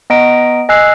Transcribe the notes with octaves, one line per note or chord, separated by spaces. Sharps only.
B3 D#5 A#5 D7
D#5 G#5 E6 F#6 C7